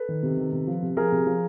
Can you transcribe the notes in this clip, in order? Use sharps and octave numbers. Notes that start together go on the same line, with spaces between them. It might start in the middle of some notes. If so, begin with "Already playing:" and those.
Already playing: A4 B4
D#3
C3
D#3
C3
F3
C3
F3 G#4 A#4
C3
F3